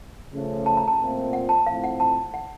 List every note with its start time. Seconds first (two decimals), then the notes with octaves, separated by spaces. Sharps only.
0.32 C#3 F3 A3 C#4
0.66 A5
0.77 A#5
0.88 A5
0.99 A#2 A3 C4 F4
1.33 F#5
1.49 A5
1.66 A2 F3 C4 F5
1.84 F#5
2.00 A5
2.34 F#5